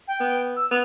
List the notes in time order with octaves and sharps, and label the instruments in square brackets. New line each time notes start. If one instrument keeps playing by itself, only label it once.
[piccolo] G5
[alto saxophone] B3
[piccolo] E6
[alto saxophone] B3 [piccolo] F7